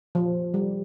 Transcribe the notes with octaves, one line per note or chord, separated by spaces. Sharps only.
F3
G3